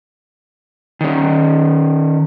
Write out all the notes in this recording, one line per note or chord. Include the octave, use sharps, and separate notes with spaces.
D#3 C#4